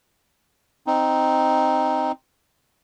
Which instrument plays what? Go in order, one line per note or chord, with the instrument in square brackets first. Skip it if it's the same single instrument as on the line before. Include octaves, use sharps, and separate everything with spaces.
[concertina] C4 D#4